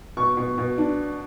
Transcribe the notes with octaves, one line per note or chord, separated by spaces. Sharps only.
B2 C#6
B2
B2
D4